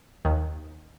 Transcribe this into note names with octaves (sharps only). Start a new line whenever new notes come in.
D#2 D#3